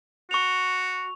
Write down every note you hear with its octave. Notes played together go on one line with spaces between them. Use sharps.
F#4 C#6 F7